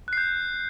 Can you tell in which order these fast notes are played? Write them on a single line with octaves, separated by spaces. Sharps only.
F#6 C7 G6